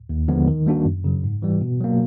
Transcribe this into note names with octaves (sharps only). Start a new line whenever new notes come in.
D#2
D3 F3 G#3 B3
D#3
G3 A#3 D4 F#4
F#2
C#3 F#3
G#2
E3 G3
B2
F#3 A#3